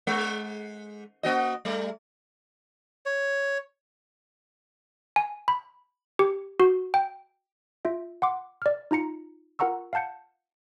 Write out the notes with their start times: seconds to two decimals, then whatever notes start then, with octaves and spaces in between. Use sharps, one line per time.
0.07 G#3
1.23 A#3 F#4 D#5
1.65 G3 A3
3.06 C#5
5.16 G#5
5.48 B5
6.19 G4
6.60 F#4
6.94 G5
7.85 F4 E5
8.22 F#5 C6 D6
8.62 D5 F6
8.91 D#4 F4 A#5 C#7
9.59 F4 A#4 F#5 A#5 C#6 E6
9.93 F5 F#5 A5 G6 C#7